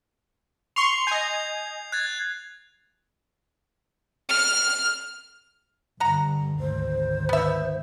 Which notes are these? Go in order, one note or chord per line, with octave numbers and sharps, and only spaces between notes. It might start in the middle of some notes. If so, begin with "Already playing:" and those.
C6 C#6 F7
D#5 G#5 G6 C7 F7
F#6 G#6 A6
F6
G2 D3 F#5 A#5
G#1 D2 C5
B3 E5